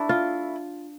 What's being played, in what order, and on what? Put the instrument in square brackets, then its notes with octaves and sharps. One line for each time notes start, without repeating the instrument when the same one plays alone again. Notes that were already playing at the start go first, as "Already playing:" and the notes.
Already playing: [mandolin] A3 E4 [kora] D4
[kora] F4